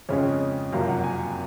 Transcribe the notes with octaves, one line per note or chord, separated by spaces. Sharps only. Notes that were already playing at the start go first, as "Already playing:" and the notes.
F2 C#3 G#3 C#4 C#5
F#1 F2 C3 F#3 F5
F#5
G#5